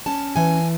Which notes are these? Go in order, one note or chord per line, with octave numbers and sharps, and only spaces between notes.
C#4 A5
E3 G#5